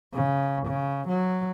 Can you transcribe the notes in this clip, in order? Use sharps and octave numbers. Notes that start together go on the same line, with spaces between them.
C#3
C#3
F#3